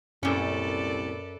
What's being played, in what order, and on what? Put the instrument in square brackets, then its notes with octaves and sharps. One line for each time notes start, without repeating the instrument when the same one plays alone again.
[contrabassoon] C2 [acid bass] F#2 [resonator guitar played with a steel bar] A#2 C#4 [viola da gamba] A4 B4 D5